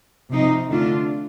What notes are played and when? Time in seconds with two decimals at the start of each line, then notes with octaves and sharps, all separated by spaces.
0.30 C3 F3 C4 D#4
0.69 D3 A3 D4 F4